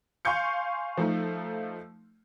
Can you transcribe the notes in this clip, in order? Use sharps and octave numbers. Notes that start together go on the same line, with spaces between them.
F5 G#5 C6 C#6 G6 C#7
F3 A3 D#4